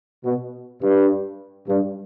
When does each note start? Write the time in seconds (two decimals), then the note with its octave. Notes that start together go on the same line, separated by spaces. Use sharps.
0.25 B2
0.82 G2
1.68 G2